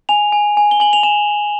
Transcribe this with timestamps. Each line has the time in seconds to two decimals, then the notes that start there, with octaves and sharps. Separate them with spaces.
0.09 G#5 F7
0.32 G#5
0.57 G#5
0.71 G7
0.80 G#5 F#7
0.93 F7
1.03 G#5 E7